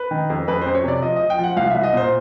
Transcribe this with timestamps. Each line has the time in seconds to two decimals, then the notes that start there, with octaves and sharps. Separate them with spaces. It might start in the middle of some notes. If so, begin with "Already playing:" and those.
Already playing: B4
0.11 D#3
0.30 F2
0.48 F2 B4
0.62 C5
0.66 F2
0.75 C#5
0.84 C3 D5
1.02 F3 D#5
1.16 D#5
1.21 F3
1.30 G5
1.39 F3 F#5
1.57 C2 F5
1.70 E5
1.75 C2
1.83 D#5
1.93 A#2 C5